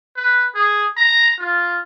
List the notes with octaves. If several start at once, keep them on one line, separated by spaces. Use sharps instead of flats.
B4
G#4
A#5
F4